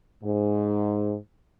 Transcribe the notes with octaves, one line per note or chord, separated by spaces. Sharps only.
G#2